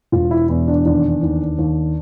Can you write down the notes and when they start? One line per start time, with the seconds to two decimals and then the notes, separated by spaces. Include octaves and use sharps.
0.12 E1 F4
0.31 E4
0.49 E2 E4
0.67 D4
0.86 D#2 D4
1.23 D#2
1.59 D#2